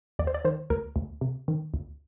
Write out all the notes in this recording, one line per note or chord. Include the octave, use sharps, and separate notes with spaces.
D#2 D5
C5
D5
D#3 C5
D2 A#4
D2
C3
D#3
D2